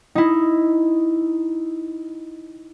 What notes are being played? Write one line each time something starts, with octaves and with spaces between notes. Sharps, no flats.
D#4 E4